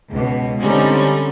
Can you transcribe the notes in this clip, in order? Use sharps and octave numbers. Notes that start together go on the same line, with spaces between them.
C#2 B2
D3 G3 C4 C#4 D#4